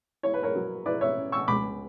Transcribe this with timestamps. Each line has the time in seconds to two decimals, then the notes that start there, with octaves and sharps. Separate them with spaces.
0.23 E4 C#5
0.34 B4
0.43 A#4 C#5
0.55 F#3
0.86 E4 B4 D5
1.01 C#5 E5
1.17 C#4
1.32 C#6 E6
1.48 C#2 B5 D6